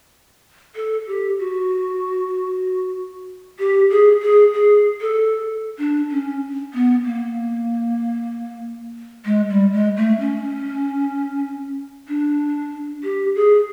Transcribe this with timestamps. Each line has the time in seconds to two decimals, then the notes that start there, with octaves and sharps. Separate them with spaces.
0.76 A4
1.07 G4
1.39 F#4
3.59 G4
3.90 G#4
4.22 G#4
4.53 G#4
5.01 A4
5.79 D4
6.11 C#4
6.74 B3
7.04 A#3
9.25 G#3
9.50 G3
9.72 G#3
9.96 A3
10.20 C#4
12.09 D4
13.04 G4
13.35 G#4